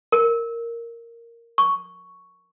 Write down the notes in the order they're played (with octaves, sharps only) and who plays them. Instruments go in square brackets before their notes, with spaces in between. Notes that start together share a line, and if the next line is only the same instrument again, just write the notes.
[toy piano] A#4
C#6